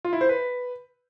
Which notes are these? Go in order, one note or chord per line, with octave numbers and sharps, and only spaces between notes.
F4
E4
C5
B4